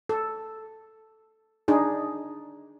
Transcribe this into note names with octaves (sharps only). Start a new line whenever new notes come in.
A4
D4 D#4 G#4